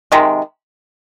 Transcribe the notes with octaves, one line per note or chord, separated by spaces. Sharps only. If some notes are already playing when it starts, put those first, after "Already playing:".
C3 D#3 G#3